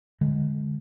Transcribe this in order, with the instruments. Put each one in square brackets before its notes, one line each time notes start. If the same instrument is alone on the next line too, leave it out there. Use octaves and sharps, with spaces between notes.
[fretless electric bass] D3 G#3